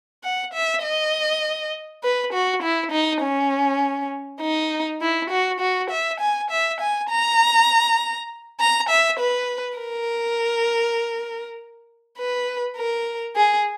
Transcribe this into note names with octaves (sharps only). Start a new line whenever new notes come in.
F#5
E5
D#5
B4
F#4
E4
D#4
C#4
D#4
E4
F#4
F#4
E5
G#5
E5
G#5
A#5
A#5
E5
B4
A#4
B4
A#4
G#4